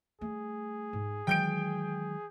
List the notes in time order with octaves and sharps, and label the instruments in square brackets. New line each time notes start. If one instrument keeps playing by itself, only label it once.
[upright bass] G3 A3 [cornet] G#4
[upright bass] G#2
[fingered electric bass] D#3 F#3 G#3 [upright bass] E3 [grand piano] G5 G6 D7